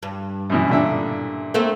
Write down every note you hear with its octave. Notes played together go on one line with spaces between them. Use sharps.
G2
F#2 B2 E3
A#2 D3 E5
A3 A#3 C4